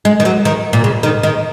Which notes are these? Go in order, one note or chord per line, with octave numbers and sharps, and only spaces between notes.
G#3
D#3
F#3
D#3
A#2
C#3
D#3
D#3